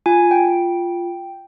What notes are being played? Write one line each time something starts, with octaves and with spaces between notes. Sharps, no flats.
F4 G#5
G5